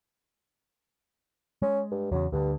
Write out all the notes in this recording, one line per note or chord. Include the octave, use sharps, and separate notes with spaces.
G#3 C#4
G2
E2 C#3 F#3
D2 G2 D3